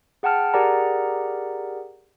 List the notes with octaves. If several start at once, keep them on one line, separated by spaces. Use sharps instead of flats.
G#4 F#5 G5 A5 F6
G4 G#4 A#4 D5 F#5 A#5